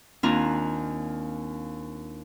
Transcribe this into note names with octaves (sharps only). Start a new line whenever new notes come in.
D#2 C4 D4 F4 G#5 A#5